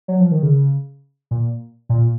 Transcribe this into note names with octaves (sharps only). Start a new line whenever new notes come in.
F#3
F3
D#3
C#3
A#2
A#2